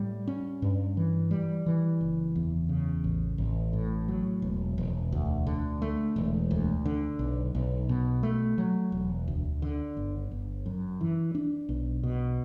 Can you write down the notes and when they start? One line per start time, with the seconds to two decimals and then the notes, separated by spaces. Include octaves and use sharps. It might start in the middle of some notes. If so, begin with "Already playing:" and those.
Already playing: A2 G3
0.27 C#4
0.62 G2
0.97 E3
1.31 G3
1.66 E3
2.01 F#1
2.36 E2
2.69 C#3
3.04 A1
3.38 A1
3.73 A2
4.08 F#3
4.42 E1
4.78 E1
5.12 D2
5.47 D3
5.82 A3
6.16 E1
6.51 D2
6.85 D3
7.19 B1
7.55 B1
7.89 B2
8.23 A3
8.58 F#3
8.92 E1
9.28 D2
9.62 D3
9.97 G1
10.31 G1
10.66 F#2
11.01 E3
11.35 D4
11.69 B1
12.03 B2